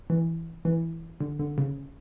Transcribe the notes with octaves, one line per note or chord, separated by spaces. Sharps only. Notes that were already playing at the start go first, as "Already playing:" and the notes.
E3
E3
D3
D3
C#3